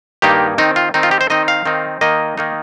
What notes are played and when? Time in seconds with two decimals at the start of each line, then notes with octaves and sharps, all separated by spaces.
0.22 G2 D#3 A#3 D#4 G4
0.58 D#3 C4 D#4
0.76 F4
0.94 D#3 C4 D#4
1.03 F4
1.11 G4
1.21 C5
1.30 D#3 C4 D#4 D#5
1.48 F5
1.66 D#3 C4 D#4
2.01 D#3 A#3 D#4 D#5
2.38 D#3 A#3 D#4